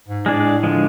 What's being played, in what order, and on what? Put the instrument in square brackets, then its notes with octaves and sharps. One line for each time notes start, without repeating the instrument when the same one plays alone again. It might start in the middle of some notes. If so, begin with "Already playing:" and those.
[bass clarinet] G#2
[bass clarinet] A2 [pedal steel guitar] G#3 D4 G#4 D5
[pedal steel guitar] D3 F3 G#3